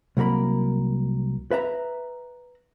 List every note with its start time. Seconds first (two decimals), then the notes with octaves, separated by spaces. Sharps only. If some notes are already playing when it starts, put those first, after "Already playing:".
0.17 C2 F#3 A#3 A#4 B5
1.51 B4 E5 A#5